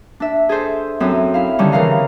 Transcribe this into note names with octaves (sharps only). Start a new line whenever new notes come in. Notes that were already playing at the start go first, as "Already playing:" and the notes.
D4 E5
G#4 A4 C5
F#2 C4 A4 E5 D#6
E4 F5
D3 D#3 G3 C#4
C#3 E3 A#4 F5 A#5